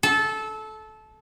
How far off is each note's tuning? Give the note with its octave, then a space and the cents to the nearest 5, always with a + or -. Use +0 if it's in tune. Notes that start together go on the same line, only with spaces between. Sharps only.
A4 -20